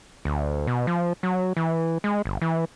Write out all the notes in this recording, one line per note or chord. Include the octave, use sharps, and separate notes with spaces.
D2
B2
F3
F#3
E3
G#3
G1
E3